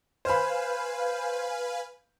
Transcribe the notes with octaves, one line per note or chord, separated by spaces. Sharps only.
B4 C5 F5 G#5 B5